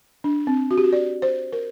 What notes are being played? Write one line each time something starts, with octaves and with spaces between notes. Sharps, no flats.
D4
C4
F#4
G4
F#4
D5
C5
A#4